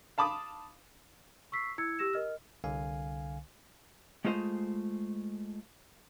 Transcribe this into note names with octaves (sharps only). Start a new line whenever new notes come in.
F5 A5 B5 D6 D#6
C#6 E6 B6 C7
E4 E6 G#6 C#7
G4 E6 A#6 E7
A#4 D#5 F6
C2 D3 F5 G#5
G#3 A3 F4 C5 D#5